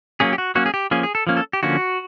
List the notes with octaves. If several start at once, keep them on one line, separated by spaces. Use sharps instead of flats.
F#3 A#3 C#4 G#4
G4
F#4
F#3 A#3 C#4 F#4
G#4
G4
F3 A#3 C#4 G#4
G#4
A4
F3 A#3 C#4
A4
G4
D3 F3 A#3 C#4 F#4